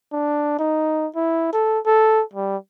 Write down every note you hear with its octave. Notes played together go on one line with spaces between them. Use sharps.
D4
D#4
E4
A4
A4
G3